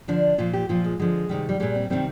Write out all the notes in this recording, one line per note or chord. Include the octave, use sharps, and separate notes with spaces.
D3 F3 D4
A#2 F3 F4
G4
A#2 F3 F4
G#3
D3 F3 G#3
C3 D#3 G3
G3
A#2 G3 G#3
C4
C3 D#3 G3 C4